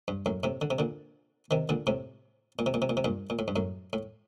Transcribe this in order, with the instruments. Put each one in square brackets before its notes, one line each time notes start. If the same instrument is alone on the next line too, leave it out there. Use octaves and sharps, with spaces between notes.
[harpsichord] G2
F#2 A2
A2 C3
D3
C3
A#2 D3
C3 D#3
A#2 D3
A2 C3
A#2
C3
A#2
C3
A#2
C3
G2 A#2
A#2
A2
G2
F#2 A2
A2